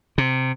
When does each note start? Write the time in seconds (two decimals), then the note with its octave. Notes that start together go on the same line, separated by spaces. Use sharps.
0.18 C3